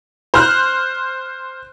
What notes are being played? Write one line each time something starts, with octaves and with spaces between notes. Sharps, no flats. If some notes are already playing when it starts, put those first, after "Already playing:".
C5 F6 F#6